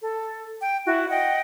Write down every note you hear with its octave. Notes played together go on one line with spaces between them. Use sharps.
A4
G5
E4 F#4
D#5 F#5 G5